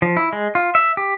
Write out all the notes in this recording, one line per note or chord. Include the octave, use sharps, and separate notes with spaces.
F3
E4
G#3
F4
E5
G4